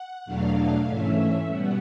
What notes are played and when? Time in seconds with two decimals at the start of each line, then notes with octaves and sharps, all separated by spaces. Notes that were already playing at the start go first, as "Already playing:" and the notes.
Already playing: F#5
0.26 E2 B2 F#3 A3 D4 F5
0.87 G#2 E3 A3 C#4 E5
1.48 B2 G3 B3 F#5